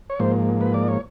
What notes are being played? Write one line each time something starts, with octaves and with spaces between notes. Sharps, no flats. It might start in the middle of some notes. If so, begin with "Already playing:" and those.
C#5
G#2 F3 A#3 C5
B4
D5
C#5